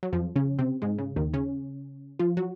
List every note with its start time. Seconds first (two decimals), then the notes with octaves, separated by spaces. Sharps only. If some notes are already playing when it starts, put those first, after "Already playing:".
0.03 F#3
0.13 F2 F3
0.36 C#3 C#4
0.59 C3 C4
0.82 G#2 G#3
0.98 C#3
1.16 D#2 D#3
1.33 C#3 C#4
2.19 F3 F4
2.37 F#3 F#4